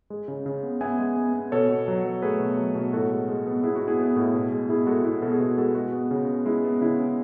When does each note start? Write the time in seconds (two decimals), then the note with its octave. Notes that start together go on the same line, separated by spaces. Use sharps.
0.10 G#3
0.28 C#3
0.46 C#3
0.63 B3
0.81 B3 E5 G#5
0.99 G#3
1.16 B3
1.34 B3
1.52 B2 A4 C#5
1.69 B2
1.88 F#3
2.04 F#3
2.22 A3 G#4 B4
2.40 B2
2.58 F#3
2.75 B2
2.93 A2 F#4 A4
3.11 G#3
3.29 G#3
3.47 B3
3.63 B3 E4 G#4
3.76 F#4
3.82 B3
3.88 E4 G#4
3.99 B3
4.16 A2
4.34 B2
4.52 G#3
4.69 B3 E4 G#4
4.87 G#3 F#4 A4
5.04 B3 E4
5.22 B2 A4
5.31 G#4
5.40 B2 F#4
5.58 G#3 F#4 A4
5.75 G#3 F#4
5.93 B3
6.11 C#3
6.28 B3
6.46 G#3 E4
6.64 B3
6.81 C#3 E4
6.99 C#3